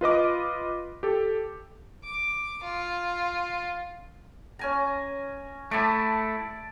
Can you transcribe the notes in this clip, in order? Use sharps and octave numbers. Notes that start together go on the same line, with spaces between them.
F4 B4 D#5 D6
G4 A4
D6
F4
C#4 G#5 A#5
A3 E4 D5 A5